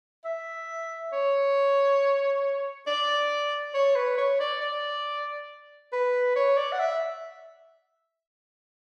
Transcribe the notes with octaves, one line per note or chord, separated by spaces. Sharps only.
E5
C#5
D5
C#5
B4
C#5
D5
D5
B4
C#5
D5
F#5
E5